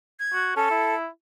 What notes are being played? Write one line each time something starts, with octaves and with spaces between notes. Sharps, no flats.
G#6
F#4
C#4 A4
E4